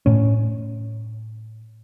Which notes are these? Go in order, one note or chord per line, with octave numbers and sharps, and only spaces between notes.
A2 C#4